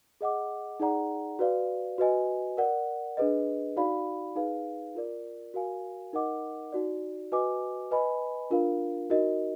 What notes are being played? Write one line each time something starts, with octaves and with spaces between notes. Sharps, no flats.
G#4 D#5 F#5 D6
D#4 G#4 D5 F#5 A#5
F#4 B4 D5 F5
F#4 B4 D#5 G#5
A#4 D5 F#5
D4 G#4 B4 D#5
D#4 F#4 D5 F5 B5
D#4 G#4 B4 F5
F4 A#4 D5
F#4 A#4 F5 G#5
D#4 A#4 D#5 F#5 D6
D#4 F#4 D5
F#4 B4 D#5 G#5 D6
B4 D#5 G#5 B5
D4 F4 A#4 F5
D#4 F#4 A#4 D#5